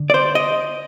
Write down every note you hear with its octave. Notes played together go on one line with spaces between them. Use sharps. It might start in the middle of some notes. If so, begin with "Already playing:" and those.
Already playing: D3
D5
C5
D#5